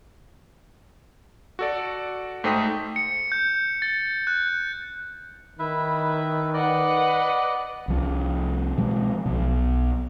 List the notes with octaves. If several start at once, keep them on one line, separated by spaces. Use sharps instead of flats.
F#4 A4 D5
G#2 A3 C5 G5 D#6 B6
C#7
G6
A6
F#6
D#3 E4 B4 E5
B4 D5 D#5 F#5
C2 F3
B2 F3 G#3
B1 B2